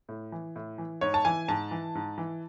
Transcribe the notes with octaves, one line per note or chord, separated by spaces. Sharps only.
A2
E3
A2
E3
G#2 C#5
A5
E3 G#5
G#2 A5
E3
G#2
E3